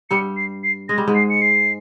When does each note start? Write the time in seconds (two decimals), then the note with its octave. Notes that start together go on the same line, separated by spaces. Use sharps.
0.10 G2 G3 C#7
0.37 C7
0.64 C7
0.89 G#3 A#6
0.98 G3
1.08 G#2 G#3
1.15 C7
1.30 C#7
1.42 C7